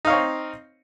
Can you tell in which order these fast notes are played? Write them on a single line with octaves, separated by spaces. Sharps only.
D#4 F5 C#5 C4